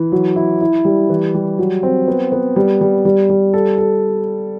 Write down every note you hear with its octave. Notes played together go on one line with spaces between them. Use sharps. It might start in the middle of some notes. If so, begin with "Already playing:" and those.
Already playing: E3
F#3
E4
E4
G3
E3
G3
F#3
C4
B3
B3
G3
G3
G3
G3
A4
A4